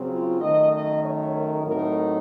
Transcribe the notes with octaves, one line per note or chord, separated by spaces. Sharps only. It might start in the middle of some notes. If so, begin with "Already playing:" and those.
Already playing: C#3 F#3 C4
F4
F#2 D#3 A3 D#5
D#5
C#5
A#4
A2 F#3 A3 C4 D#4 A#4